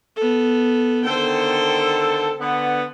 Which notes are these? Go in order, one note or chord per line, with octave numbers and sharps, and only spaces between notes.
B3 A4
D3 D#3 A4 C5 G5
D3 B3